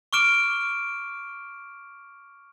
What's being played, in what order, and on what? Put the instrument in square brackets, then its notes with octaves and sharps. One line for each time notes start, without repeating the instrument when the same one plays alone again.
[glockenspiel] C#6 D6 F6 D7 E7